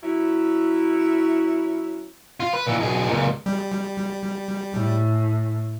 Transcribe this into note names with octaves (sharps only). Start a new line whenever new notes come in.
F#3 C#4 E4
F4
B4
A#2 E3
B1 G#4
C#2 A#2
G3
A2